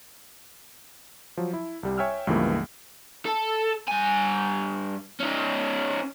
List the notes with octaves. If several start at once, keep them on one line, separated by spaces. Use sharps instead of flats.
F3 F#3
E4
C2 G3
C#5 E5 G5 G#5 E6 F6
C#2 G2 E3 F3 A3 A#3
A4
G2 G#5
C#4 D#4